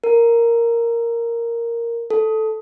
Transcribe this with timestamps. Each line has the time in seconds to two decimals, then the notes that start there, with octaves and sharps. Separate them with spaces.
0.04 A#4
2.10 A4